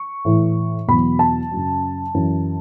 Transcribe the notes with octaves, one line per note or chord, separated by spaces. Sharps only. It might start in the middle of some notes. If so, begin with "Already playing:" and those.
Already playing: C#6
A2 E3
E2 B2 F#3 B5
A5
F#2 C#3 F#3
F#2 E3